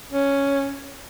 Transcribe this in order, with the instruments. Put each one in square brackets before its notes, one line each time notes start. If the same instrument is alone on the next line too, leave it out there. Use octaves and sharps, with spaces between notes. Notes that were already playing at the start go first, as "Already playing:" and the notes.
[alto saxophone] C#4